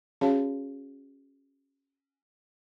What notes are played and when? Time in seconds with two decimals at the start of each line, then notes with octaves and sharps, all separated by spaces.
0.21 C#4 F#4 G#4 C#5 F5 A5